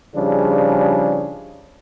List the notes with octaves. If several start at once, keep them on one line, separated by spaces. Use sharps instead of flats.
C#3 F3 G3 D4 D#4 G#4